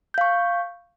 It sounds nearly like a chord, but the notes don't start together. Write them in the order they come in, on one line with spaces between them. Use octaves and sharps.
G6 F5 C#6